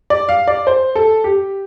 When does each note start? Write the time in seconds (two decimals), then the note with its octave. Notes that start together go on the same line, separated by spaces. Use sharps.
0.10 D5
0.29 F5
0.47 D5
0.67 C5
0.96 A4
1.24 G4